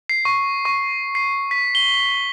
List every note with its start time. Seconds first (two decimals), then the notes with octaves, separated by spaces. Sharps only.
0.09 C7
0.25 C#6
0.65 C#6
1.15 C7
1.51 B6
1.75 G7